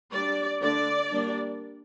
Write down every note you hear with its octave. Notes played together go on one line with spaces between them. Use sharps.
G3 D4 D5
D3 A3 D4 D5
G3 A#3 D4